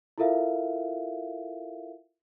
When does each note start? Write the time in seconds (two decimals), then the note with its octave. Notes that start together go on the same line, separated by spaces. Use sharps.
0.18 E4 F4 A4 A#4 E5 F5